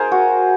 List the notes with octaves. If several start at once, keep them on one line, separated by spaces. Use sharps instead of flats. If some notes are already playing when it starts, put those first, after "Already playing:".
Already playing: A#3 D#4 G#4 A#4 C5
F#4